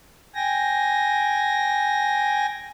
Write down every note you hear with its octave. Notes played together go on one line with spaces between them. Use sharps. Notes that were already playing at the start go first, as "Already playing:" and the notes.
G5 G#5 A#6